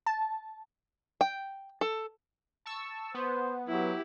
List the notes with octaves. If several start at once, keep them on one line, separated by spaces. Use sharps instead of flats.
A5
G5
A4
A5 C#6 E6
B3 B4 C5
F#3 E4 G4